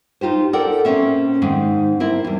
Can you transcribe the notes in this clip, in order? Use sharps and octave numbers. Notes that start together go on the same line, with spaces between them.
D#4 F4 G4 C5
A4 A#4 D5 F#5 G5
A#2 F#3 C4 C#4 E5
G#2 D#3 C4
C4 E4 A#4
E2 G3